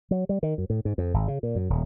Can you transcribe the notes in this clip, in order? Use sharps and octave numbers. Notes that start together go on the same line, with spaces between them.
F#3
G3
D#3
F#2
A2
G#2
F2
G#1
C#3
A#2
F#2
D#1